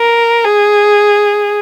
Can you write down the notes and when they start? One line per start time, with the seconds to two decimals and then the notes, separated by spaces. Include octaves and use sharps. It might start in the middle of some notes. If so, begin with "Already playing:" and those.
Already playing: A#4
0.45 G#4